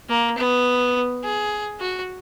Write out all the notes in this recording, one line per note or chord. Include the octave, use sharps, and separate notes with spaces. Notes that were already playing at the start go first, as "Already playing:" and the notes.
A#3
B3
G#4
F#4